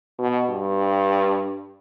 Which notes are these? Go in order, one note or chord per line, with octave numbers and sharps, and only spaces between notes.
B2
G2